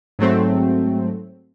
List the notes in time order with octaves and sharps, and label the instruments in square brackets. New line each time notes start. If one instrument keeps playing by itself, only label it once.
[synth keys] G#2 F#3 A3 C4